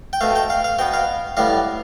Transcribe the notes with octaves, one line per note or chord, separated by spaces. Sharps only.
G5
B2 A3 F5
G5
F5
F5
B2 B3 G5
F5
A2 G3 B3 F5